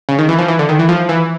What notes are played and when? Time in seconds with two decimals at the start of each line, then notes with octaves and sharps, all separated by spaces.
0.09 C#3
0.19 D#3
0.29 E3
0.39 F3
0.48 E3
0.59 D3
0.69 D#3
0.79 E3
0.89 F3
1.09 E3